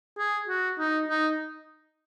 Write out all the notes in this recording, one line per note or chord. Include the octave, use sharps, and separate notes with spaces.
G#4
F#4
D#4
D#4